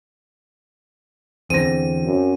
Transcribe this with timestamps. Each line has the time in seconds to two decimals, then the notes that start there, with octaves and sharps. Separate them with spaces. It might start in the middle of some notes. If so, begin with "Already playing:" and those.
1.50 E2 D3 C4 A#6 D#7
2.06 F#2